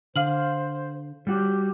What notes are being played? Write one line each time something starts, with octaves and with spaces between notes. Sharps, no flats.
D3 C5 F5 F6 F#7
G3 F#4 G4